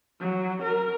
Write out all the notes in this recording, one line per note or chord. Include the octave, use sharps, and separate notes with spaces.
F#3
A#4